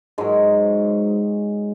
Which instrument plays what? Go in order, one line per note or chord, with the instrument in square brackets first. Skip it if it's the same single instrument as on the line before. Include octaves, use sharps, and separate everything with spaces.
[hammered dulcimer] G#2 F#3 G#3